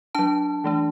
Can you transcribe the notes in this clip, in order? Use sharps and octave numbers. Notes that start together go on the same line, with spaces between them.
F#3 D4 A5
E3 A3 D4